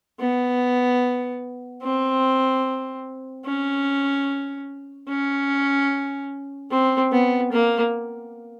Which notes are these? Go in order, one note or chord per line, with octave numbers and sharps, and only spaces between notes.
B3
C4
C#4
C#4
C4
B3
A#3